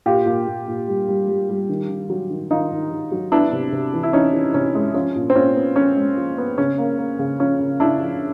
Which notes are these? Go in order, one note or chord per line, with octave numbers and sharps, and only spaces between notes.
A#2 F4 G4
A#2
A#2
A#2
G3
G3
G3
G3
D#3
D#3
F#3
D#3
D#3 D#4 F4
D#3
D#3
F#3
B3 D4 E4
C3
C3
E3
E4
E3 C#4 D#4
E3
C3 C#4
G#3
F3 C#4
A#2
C4
A#2 C#4
B3
F3 C#4
G#3
F3
B3
C#3 C#4
A#3
A#3
C#3
F3 C#4
C#3
C#3 D4 E4
F3